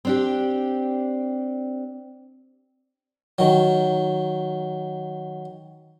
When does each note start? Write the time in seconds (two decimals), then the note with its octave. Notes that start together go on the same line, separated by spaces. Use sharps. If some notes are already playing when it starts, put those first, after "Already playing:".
0.05 C4 D4 G4
3.39 D#3 F#3